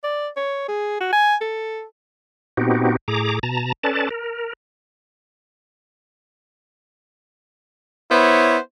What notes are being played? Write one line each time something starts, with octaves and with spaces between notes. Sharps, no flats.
D5
C#5
G#4
F#4
G#5
A4
A#2 B3 C4 D#4 F#4 G4
A2 G#4 A#5 D6
B2 A5 A#5
C#4 A4 B4 D5 A5
A#4
B3 E4 C5 C#5